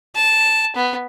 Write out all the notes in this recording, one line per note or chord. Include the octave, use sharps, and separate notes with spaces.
A5
B3